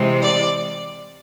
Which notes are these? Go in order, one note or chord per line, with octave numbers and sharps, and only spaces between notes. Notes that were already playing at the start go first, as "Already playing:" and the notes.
Already playing: C3 E3 G#3 C4
D5